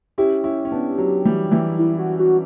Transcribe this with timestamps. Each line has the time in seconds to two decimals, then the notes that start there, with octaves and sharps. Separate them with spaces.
0.18 C#4 E4 G4
0.44 C#4 E4
0.65 C#4
0.72 B3 D4
0.98 F#3
1.25 E3 G3
1.51 E3 G3
1.79 E4
1.99 F#4
2.19 F#4